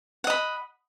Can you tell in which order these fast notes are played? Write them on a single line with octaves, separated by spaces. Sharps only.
F#5 D#5 B5